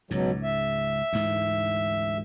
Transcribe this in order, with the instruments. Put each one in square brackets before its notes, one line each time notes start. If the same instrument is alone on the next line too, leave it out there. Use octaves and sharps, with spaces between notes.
[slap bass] C#2 G#2 [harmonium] B2 F#3
[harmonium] E5
[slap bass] D2 G#2 E3